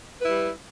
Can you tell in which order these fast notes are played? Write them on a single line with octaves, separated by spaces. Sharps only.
B4 E4 G3